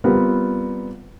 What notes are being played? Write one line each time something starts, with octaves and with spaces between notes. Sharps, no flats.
G3 B3 C4 F4 A#4